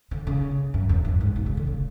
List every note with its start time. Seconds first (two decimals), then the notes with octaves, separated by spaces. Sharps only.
0.11 D3
0.27 C#3
0.74 F#2
0.89 E2
1.05 F#2
1.21 G#2
1.36 B2
1.46 C#3
1.57 D3
1.67 C#3